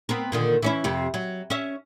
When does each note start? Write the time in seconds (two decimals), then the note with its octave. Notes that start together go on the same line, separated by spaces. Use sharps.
0.09 B3 C4 A#4
0.32 A#2 D3 D#3
0.62 E3 C#4 E4
0.84 F2 C3
1.14 F#3
1.50 C#4 E5